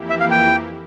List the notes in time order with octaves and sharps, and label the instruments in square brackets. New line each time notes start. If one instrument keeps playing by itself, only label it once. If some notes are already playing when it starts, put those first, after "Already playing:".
Already playing: [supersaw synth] F2 E3 A#3 E4 G4
[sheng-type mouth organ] E5
F5
G5